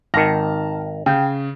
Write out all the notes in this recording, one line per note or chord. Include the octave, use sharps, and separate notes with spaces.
G#1 D#3 A5 F6 A#6
C#3 G5